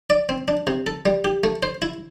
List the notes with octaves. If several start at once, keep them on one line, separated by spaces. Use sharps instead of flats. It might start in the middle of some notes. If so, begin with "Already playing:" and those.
D5
C4
D4
C3
A4
G3
G4
A3
C5
E4